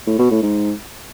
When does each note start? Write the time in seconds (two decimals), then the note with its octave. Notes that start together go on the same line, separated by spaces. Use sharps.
0.07 A2
0.19 B2
0.31 A2
0.43 G#2